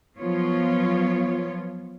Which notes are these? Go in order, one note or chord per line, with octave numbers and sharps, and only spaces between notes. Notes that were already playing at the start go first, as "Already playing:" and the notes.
F3 F#3 B3 F4 C#5